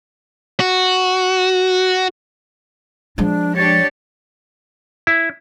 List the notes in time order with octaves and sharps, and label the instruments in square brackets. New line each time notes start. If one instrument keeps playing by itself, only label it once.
[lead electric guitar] F#4
[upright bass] F3 G#3 [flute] D4
[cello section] D4 G4 C#5 [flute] A6
[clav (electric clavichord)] E4